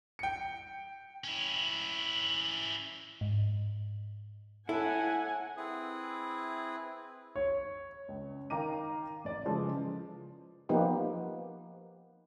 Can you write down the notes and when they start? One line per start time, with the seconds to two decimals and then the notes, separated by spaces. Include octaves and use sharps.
0.19 G5 C#7
1.24 C#4 E4
3.21 G#2
4.69 A2 E4 A4 F#5 G#5
5.57 C4 E4 G#4 B4
7.36 C#5
8.08 C#2
8.50 D#3 F5 G5 A#5 D6 D#7
9.24 A1 D5
9.45 C#3 E3 F3 G#3 A4
10.69 F3 A#3 B3 D#4 G4